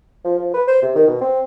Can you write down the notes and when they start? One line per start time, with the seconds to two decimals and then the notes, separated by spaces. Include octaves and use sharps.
0.25 F3
0.39 F3
0.54 B4
0.67 C5
0.82 C3
0.96 D#3
1.08 B2
1.21 C4